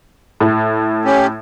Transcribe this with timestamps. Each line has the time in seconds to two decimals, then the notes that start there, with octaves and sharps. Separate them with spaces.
0.40 A2
1.05 C#4 G4